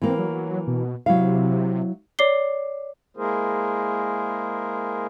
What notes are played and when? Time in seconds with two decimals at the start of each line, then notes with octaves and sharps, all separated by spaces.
0.02 E3 A#3 C4
0.18 F#3
0.67 B2
1.06 C3 F#3 E4 F5
2.19 C#5 D5 D6 C7 G7
3.17 G#3 A#3 E4 G#4 A#4 C5